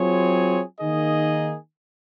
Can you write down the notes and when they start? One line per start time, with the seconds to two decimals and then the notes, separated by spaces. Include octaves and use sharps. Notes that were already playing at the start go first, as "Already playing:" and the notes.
Already playing: F#3 C4 F4 G#4 C#5
0.80 D#3 A#3 D#4 G#4 D#5